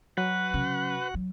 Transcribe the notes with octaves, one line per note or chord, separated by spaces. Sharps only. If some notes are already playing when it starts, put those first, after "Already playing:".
F#3 F#4 B4 F#5
C#3
F#3